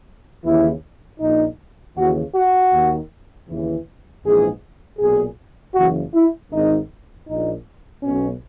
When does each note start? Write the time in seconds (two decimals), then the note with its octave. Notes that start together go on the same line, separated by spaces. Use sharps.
0.44 D#2 C#3 E3 E4
1.20 A#1 A#2 D#4
1.96 D#2 C#3 E3 F#4
2.34 F#4
2.71 D#2 D#3
3.48 D#2 C#3 E3
4.24 A#1 G#2 E3 G#4
4.99 B1 A#2 G#4
5.75 F#1 F#2 E3 F#4
6.14 E4
6.51 G#1 G#2 D#3 D#4
7.28 A#1 A#2 D#4
8.03 B1 B2 C#4